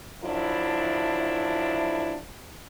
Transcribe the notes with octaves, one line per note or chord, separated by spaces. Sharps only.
F#2 F3 D4 E4